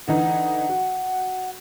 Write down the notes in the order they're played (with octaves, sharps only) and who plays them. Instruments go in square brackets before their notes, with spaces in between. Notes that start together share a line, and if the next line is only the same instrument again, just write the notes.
[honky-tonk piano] D3 E3 D#4 [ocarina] F#5
[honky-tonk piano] F#4